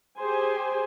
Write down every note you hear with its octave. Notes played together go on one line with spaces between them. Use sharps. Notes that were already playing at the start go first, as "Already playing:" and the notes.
G4 G#4 C5 G#5